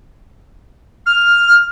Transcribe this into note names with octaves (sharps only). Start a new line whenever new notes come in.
F6